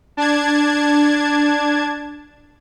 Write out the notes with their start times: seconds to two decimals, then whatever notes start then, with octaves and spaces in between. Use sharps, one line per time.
0.17 D4 A5 G#6